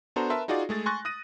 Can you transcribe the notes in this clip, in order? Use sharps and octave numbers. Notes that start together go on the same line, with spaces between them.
B3 D4 F#4 A4 C5 A#5
A#4 B4 E5 A5 C6
D#4 F4 F#4 G#4 D5
G#3 A3 G#4 A6
G#5 C6 C#6 F#6 A6 A#6
D#6 F#6 A#6 D#7